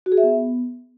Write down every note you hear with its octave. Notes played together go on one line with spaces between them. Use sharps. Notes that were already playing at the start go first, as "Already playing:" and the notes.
F#4
G#4
E5
B3